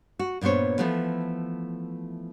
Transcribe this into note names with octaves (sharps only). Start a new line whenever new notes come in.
F#4
G2 A#2 B3 C5 C#5
E3 F3 A3 B3